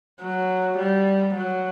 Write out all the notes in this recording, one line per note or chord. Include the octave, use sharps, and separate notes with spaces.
F#3
G3
F#3